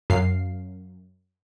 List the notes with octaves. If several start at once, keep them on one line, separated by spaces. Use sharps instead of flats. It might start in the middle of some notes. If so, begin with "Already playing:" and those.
F#2 F5 C7